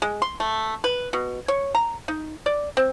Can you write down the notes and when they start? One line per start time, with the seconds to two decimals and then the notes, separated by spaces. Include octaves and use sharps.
0.02 G#3
0.22 C6
0.40 A3
0.84 B4
1.13 B2
1.48 C#5
1.75 A#5
2.08 D#4
2.46 D5
2.77 C4